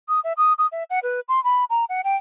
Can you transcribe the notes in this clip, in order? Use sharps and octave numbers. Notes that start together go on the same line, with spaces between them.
D#6
E5
D#6
D#6
E5
F#5
B4
C6
B5
A#5
F#5
G5